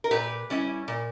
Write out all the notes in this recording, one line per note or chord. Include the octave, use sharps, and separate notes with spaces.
A#4
A#2 G4 B4
G3 C#4 E4
A#2